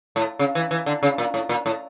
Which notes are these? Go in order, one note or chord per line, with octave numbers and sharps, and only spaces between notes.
A2
C#3
E3
E3
D3
C#3
A#2
A2
A#2
A2